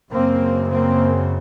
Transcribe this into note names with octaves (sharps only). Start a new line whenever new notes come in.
F#2 C#3 A#3 C4
A#3 C4